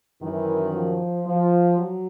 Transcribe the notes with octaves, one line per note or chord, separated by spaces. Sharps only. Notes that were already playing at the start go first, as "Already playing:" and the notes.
F#2 D#3 E3
F3
F3
F#3